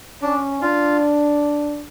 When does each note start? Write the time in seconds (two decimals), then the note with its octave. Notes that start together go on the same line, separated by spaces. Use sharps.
0.22 C#4 D4
0.62 D4 F4